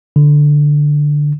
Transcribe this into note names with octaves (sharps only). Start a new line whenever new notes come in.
D3